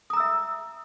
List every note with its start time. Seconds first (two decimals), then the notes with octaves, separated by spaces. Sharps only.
0.10 D#6
0.13 A#5
0.17 E6
0.20 E5